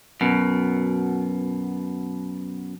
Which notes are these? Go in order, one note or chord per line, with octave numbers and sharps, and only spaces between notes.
F#2 B2